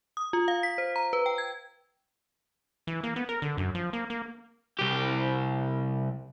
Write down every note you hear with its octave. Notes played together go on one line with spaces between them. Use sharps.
D#6
F4
F5
B6
C5
A#5
B4
G5
G#6
E3
A#3
B3
A#4
D3
F#2
F3
A#3
A#3
C2 G4